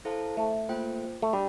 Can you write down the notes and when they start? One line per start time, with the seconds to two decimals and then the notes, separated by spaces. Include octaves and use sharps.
0.05 E4 A4 C5 F5 A5
0.37 A3
0.69 A#3 F4 C5 G5
1.22 A3
1.33 G3 D4 G4